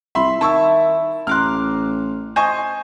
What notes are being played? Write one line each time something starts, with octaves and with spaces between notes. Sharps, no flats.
C2 E5 B5 C6
D#3 E4 A5 C#6 E6
A1 A#5 C6 D6 F6 F#6
C5 D#5 G#5 C#6